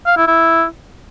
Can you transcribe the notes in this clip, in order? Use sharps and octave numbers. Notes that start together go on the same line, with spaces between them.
F5
E4
E4